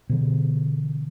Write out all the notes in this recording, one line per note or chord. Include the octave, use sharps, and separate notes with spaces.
B2 D3 E3